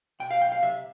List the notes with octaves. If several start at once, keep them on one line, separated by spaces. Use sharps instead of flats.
B2 G5
F5
B1 G5
F5
C3 E5